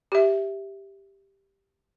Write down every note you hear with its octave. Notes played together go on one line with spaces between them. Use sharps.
G4 E5